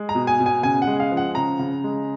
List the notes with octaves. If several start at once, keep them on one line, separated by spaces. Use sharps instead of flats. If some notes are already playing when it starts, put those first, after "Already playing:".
Already playing: G#3
A#5
B2
G#5
B2
G#5
C#3 G#5
F#5
G#3
F5
F3
F#5
C#3 A#5
C#3
G#3